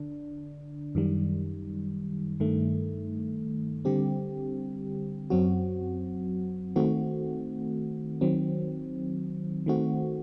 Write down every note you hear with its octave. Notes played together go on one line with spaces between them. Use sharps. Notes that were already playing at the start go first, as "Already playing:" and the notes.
Already playing: D3 D4
F#2 D#3 G3
G2 D#3 A3
D3 G3 C4 G4
F#2 F#3 C4 F#4
D#3 A3 C4 F#4
D#3 F#3 C4
D#3 A3 C4 F#4